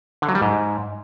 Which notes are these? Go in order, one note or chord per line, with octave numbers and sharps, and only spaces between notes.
D3
F#3
G3
G#2